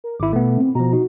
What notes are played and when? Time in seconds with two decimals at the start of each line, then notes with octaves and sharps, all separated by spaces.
0.04 A#4
0.20 G#1 E4 D6
0.33 B2 A3 B3
0.58 C4
0.75 B2 F3 A#5
0.93 D#4 F#4